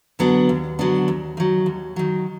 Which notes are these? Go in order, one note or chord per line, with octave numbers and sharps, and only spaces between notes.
D3 F#3 B3 D4
D#2
D3 F#3 B3 D4
D#2
D#3 F#3
D#2
D#3 F#3